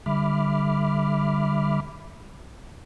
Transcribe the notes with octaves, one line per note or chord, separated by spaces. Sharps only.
D3 G3 E5 B5 D6 F6